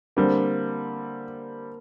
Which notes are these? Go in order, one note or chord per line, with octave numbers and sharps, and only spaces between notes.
D3 G3 A#3 C4